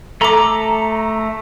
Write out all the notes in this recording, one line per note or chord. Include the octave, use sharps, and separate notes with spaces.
A3 A4 A#5 D6